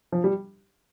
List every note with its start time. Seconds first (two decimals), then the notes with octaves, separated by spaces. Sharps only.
0.12 F3
0.24 G3